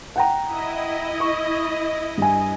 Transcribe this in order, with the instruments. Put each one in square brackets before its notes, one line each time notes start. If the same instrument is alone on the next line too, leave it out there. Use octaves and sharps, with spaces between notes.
[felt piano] F#5 G5 A#5
[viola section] E4 D#5
[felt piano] C#6
G2 G#5